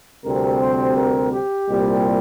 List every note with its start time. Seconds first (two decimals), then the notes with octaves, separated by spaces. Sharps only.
0.24 D2 C3 G3 C4 A#4
0.61 C5
0.96 A#4
1.32 G4
1.69 C2 A#2 G3